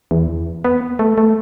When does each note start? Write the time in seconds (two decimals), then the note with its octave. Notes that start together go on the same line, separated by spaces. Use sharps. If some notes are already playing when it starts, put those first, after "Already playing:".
0.11 E2
0.64 B3
0.99 A3
1.18 A3